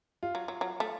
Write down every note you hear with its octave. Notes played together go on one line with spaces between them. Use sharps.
F4
F#3
F#3
F#3
A3